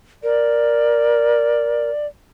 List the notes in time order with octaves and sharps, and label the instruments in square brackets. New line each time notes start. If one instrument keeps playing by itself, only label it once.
[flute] A#4 [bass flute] D5